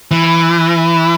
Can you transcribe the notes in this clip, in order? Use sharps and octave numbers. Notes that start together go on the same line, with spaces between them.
E3